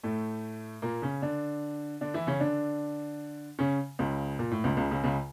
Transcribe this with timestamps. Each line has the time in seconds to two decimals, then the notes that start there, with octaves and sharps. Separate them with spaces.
0.03 A2 A3
0.82 A#2 A#3
1.02 C#3 C#4
1.22 D3 D4
2.01 D3 D4
2.14 E3 E4
2.27 C#3 C#4
2.40 D3 D4
3.59 C#3 C#4
3.99 C#2 C#3
4.39 A#2
4.51 A2
4.64 C#2 C#3
4.77 C#2 C#3
4.91 C#2 C#3
5.04 C#2 C#3